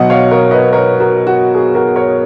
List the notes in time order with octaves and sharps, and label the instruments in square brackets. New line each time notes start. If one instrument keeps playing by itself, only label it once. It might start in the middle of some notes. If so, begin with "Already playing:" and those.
Already playing: [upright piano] B2 F#3 D#5 F#5
C#5 F5
A#4 C#5
B4 D#5
A#4 C#5
F#4 A#4
F#4
G#4
F#4 A#4
A#4 C#5